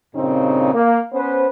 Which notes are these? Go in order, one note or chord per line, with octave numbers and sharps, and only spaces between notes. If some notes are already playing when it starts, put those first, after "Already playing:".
G2 A#2 C#3 C4 D#4
A#3
B3 C#4 B4 C5